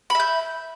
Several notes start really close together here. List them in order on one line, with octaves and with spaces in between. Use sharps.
B5 E5 G6